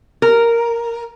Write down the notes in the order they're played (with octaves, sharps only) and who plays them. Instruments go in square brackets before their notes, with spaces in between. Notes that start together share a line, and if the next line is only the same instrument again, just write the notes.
[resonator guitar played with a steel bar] A#4